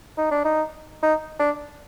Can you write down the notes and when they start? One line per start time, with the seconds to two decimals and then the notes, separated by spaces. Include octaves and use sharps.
0.18 D#4
0.31 D4
0.44 D#4
1.03 D#4
1.39 D4